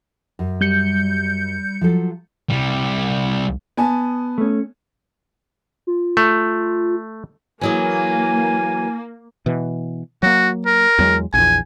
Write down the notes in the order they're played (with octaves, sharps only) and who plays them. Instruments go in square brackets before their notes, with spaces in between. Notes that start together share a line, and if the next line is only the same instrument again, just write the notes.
[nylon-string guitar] F#2
[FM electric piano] G3 G6 C#7
[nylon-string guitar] F3 F#3 A4
[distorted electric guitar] C2 G3
[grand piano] B3 G#5 A5
[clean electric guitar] A3 C#4
[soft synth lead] F4
[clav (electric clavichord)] A3
[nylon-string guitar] E3 F#3 G#4 [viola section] A#3 [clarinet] G#5
[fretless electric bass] B2 E3
[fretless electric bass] F#3 A#3 [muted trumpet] F#4
[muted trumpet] A#4
[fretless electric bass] E2 F#3 G#3
[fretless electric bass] A#1 E2 [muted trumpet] G#5